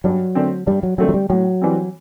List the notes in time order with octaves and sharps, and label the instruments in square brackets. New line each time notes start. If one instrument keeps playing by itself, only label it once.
[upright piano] G2 [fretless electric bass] F#3
[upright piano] D3 A3 C4
[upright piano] G2 [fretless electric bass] G3
[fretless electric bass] F#3
[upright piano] D3 A3 C4 [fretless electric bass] F#3
[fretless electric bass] F#3
G3
[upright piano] A2 [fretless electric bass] F#3
[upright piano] E3 G3 C4